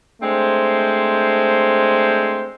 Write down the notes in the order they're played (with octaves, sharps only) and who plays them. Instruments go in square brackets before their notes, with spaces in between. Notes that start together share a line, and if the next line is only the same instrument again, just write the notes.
[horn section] G#3 A3 C4 D4 C5